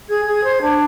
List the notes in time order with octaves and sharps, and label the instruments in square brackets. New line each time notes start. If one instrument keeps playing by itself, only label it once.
[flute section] G#4 G#6
G#4
C5
D4